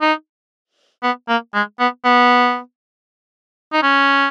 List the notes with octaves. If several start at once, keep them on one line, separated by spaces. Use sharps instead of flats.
D#4
B3
A#3
G#3
B3
B3
D#4
C#4